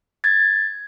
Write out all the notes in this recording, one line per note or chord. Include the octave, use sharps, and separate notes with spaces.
G#6 A6